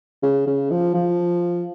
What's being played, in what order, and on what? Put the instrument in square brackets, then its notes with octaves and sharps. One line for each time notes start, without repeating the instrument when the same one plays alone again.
[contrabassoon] C#3
C#3
F3
F3